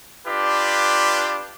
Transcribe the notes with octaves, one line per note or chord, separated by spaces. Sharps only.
D4 F4 G4 B4